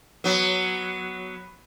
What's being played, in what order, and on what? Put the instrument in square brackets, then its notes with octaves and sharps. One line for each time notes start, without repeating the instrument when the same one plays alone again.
[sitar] F#3 B3